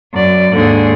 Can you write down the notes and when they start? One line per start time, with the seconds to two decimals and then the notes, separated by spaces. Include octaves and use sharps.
0.13 F#2 D5
0.52 D#2 G#2 D3 G#4